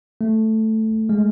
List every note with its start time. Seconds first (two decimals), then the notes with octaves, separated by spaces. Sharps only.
0.21 A3
1.09 G#3